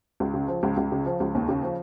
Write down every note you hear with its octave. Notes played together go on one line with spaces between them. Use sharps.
C#2
C#3
F3
C#2
C#2
C#3
F3
C#2
D#2
C#3
F3